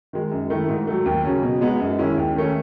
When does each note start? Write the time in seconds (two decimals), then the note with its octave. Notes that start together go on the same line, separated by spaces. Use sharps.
0.13 D#3 G#3
0.31 F#2
0.50 D#3 A3 E4
0.69 G#2
0.87 F#3 A3
1.06 D#2
1.24 C#3 F#3 C#4
1.43 B2
1.61 G#3 B3 D#4
1.80 F#2
1.99 D#3 G#3 C#4 E4
2.17 D#2
2.36 D#3 A3 C#4